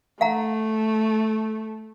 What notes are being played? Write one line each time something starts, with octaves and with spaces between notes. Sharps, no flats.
A3 F5 F#5 A#5